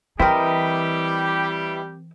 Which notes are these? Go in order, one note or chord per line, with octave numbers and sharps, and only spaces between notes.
E3 G3 C4 E4 G4 A#4 B4 D#5